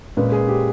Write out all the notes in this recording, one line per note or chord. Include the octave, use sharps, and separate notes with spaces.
A#2 G#3 C#4 B4
G#4
G4